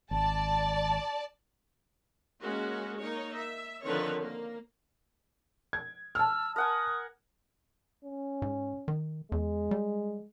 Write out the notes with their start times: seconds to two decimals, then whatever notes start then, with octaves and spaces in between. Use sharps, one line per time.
0.11 G#1 D5 A5
2.42 G#3 A#3 C#4 F#4
3.01 A#3 D#4 C#5
3.38 E5
3.85 D3 D#3 F3 C4 B4 C#5
4.23 A#3
5.73 G#6
6.15 A5 E6 F6
6.56 A#4 F#5 G#5 D#6
8.05 C#4
8.42 G#2
8.88 D#3
9.32 E2 G#3
9.71 G3